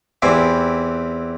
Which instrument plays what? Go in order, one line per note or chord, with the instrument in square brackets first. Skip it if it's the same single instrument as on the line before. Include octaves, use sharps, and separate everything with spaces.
[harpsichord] E2 E3 C4 E4 G4